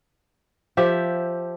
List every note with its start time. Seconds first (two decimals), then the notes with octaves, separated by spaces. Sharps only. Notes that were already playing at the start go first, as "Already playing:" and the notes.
0.77 F3 G4 E5